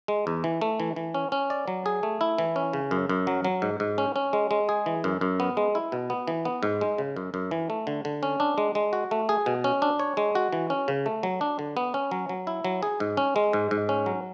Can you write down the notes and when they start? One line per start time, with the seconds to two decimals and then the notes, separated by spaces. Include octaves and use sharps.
0.08 G#3
0.27 E2
0.44 E3
0.61 A3
0.80 E3
0.96 E3
1.14 C#4
1.32 C#4
1.50 D5
1.68 F#3
1.86 G#4
2.03 A3
2.21 E4
2.38 E3
2.56 C#4
2.73 C#3
2.91 F#2
3.09 F#2
3.27 F#3
3.45 F#3
3.62 G#2
3.80 G#2
3.98 C#4
4.16 C#4
4.33 G#3
4.51 G#3
4.69 G#4
4.86 E3
5.04 F#2
5.21 F#2
5.40 B3
5.57 G#3
5.75 E4
5.92 B2
6.10 B3
6.28 E3
6.45 B3
6.63 G#2
6.81 G#3
6.98 C#3
7.16 F#2
7.34 F#2
7.51 E3
7.70 A3
7.87 D3
8.05 D3
8.23 C#4
8.40 D4
8.58 G#3
8.75 G#3
8.93 F#4
9.11 A3
9.29 G#4
9.46 B2
9.64 C#4
9.82 D4
9.99 C#5
10.17 G#3
10.35 F#4
10.53 E3
10.70 C#4
10.88 C#3
11.06 A3
11.23 F#3
11.41 D4
11.59 D3
11.77 B3
11.94 C#4
12.11 F#3
12.29 F#3
12.47 E4
12.64 F#3
12.83 G#4
13.00 G#2
13.17 C#4
13.36 G#3
13.53 G#2
13.71 G#2
13.89 C#4
14.06 F#3